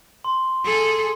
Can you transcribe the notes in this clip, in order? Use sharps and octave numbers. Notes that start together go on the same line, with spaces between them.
C6
G#4 A4